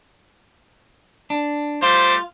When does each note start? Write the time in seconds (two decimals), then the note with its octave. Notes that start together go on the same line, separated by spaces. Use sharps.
1.30 D4
1.82 G3 A3 F4 C5 D6